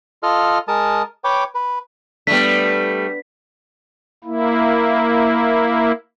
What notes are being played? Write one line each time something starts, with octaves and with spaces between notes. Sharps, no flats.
F4 A4 D#5 F6
G#3 A#4 A5 D#6
B4 C#5 G5 D6
B4
G3 A3 B3 D4 B6
A#3 E4